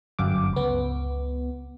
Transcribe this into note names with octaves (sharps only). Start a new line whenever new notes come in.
G1 F#2 D6
C#2 B3